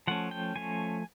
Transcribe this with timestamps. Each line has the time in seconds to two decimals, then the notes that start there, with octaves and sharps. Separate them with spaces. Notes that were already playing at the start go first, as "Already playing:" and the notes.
0.07 F3 A3 C#4 F#5
0.31 G5
0.55 F3 A3 C#4 G#5